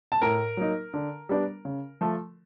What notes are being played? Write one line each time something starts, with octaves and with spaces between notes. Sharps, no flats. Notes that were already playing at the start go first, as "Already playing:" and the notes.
A5
A2 A#4 A#5
F#3 A#3 D#4
D3
G3 B3 D4
C#3
F3 A3